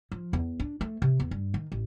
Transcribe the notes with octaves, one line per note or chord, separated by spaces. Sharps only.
F3
E2
D4
A3
C3
E2
G2
D#3
A1